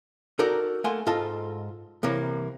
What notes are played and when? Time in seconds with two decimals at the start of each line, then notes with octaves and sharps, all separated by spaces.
0.39 D#4 F#4 A4 A#4 D5
0.84 A3 A#3 F#5 G#5 C6
1.07 G#2 F4 A4 D#5 A5
2.03 C2 C3 E3 A#3 C#5